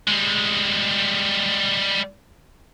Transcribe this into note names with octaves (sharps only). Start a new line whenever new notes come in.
G3 G#3